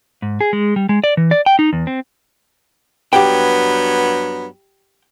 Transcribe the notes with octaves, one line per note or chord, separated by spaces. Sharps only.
G#2
G#4
G#3
G3
G#3
D5
E3
D5
G5
D#4
E2
C4
G2 F#3 B3 G4 F#5 G5